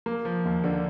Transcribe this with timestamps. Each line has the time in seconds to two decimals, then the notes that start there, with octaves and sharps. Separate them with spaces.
0.06 A#3
0.25 F3
0.45 D#2
0.64 D3